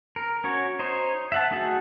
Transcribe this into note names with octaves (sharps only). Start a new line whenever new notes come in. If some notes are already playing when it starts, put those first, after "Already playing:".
A#4
C#4 F#4 C#5
D#4 C5 C#5
E5 F#5 A5
A3 D#4 F#4 G#4 A4